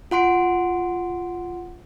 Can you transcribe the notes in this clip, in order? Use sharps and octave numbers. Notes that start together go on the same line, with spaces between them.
F4 F#5 C6 D7